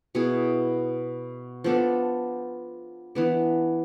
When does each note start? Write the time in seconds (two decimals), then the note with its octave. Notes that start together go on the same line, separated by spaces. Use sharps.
0.15 B2 B3 E4 G#4
1.64 F3 B3 D4 A4
3.15 E3 B3 D4